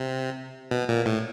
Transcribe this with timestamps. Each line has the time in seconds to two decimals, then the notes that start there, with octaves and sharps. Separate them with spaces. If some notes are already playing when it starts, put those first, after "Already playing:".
Already playing: C3
0.71 B2
0.89 A#2
1.06 A2